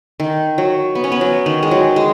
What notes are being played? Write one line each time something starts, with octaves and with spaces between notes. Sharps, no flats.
D#3
F#3
B3
C#4
B3
F#3
D#3
G#3
F#3
G#3